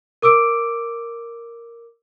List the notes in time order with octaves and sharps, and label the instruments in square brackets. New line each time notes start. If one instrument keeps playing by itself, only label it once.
[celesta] A#4 D6 E6 D7